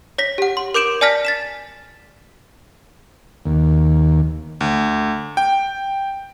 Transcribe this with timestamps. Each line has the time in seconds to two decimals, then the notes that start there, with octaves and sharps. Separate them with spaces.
0.18 C#5 A#6 B6
0.38 G4 F#5
0.57 C6
0.74 A#4 D6 G6 D7 E7 F#7
1.01 D5 G#5 A5 F6 A#6 B6
1.25 A6 B6 E7
3.46 D#2
4.61 D2
5.37 G5